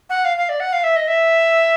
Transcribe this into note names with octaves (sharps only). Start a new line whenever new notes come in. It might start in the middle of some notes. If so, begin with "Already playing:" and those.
F#5
F5
F5
D5
F#5
F5
E5
D#5
E5